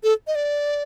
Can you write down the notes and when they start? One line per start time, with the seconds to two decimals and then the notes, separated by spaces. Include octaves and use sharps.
0.03 A4
0.27 D#5
0.35 D5